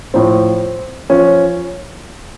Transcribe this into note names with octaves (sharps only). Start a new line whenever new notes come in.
A2 F3 C4
F3 C#4